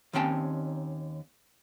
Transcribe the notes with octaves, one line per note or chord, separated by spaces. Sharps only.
D#2 D#3 C4 C#4 G5 A5